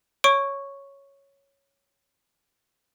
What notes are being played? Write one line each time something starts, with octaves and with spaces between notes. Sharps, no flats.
C#5 C#6 D7